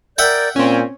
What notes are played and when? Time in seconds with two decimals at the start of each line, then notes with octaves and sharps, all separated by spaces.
0.18 A#4 D5 E5 F#5 G5 G6
0.56 A#2 C4 C#4 G#5